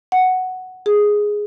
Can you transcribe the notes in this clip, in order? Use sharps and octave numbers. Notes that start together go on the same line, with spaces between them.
F#5
G#4